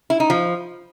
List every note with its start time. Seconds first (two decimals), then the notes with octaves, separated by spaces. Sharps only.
0.10 E4
0.20 D#4
0.30 F3